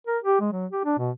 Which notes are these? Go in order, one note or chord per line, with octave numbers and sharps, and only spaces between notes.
A#4
G4
G#3
F#3
G4
D4
B2